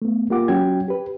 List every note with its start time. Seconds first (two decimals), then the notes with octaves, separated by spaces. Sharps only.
0.02 A3 B3
0.30 A#3 F4 G4 F#5 D6
0.48 F#3 C#4 F#4 G5 G#6
0.88 G4 B4